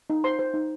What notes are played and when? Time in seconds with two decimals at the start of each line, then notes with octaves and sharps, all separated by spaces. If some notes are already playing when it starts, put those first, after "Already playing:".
0.10 D#4
0.24 C5 C6
0.39 C5
0.54 D#4